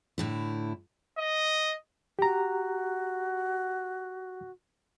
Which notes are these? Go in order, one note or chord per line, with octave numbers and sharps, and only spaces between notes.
A2 D3 E4
D#5
F#4 G4 A#5